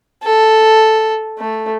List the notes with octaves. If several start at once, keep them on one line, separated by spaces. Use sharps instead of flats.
A4
A3